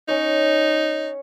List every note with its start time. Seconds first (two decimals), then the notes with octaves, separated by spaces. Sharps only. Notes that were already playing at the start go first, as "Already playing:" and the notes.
0.08 C#4 D#4 C#5